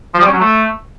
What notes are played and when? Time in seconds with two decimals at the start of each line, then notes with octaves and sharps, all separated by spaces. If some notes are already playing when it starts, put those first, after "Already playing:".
0.14 F3
0.21 G3
0.27 C#4
0.34 F#3
0.40 A3